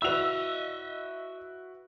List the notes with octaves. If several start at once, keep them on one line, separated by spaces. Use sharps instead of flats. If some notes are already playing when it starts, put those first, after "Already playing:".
E4 F#4 B4 D#5 E5 E6 F7